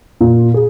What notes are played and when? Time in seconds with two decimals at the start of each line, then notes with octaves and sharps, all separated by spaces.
0.21 A#2
0.54 G#4